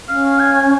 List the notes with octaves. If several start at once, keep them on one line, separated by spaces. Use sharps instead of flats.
C#4 F5
G#5